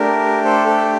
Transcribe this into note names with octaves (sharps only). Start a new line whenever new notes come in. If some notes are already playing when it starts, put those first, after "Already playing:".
Already playing: A3 D4 G4 A#4
A4 C5
A4